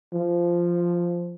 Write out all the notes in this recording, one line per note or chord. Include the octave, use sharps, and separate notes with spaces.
F3